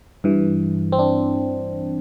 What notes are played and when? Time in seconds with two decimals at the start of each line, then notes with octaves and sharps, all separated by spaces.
0.24 G2 E3
0.92 C4
0.99 D4